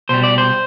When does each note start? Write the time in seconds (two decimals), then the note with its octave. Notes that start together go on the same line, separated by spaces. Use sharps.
0.09 B2 G3 C5
0.23 D5
0.38 C5